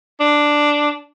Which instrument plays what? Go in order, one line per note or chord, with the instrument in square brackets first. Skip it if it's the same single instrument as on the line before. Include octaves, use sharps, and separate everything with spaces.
[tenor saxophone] D4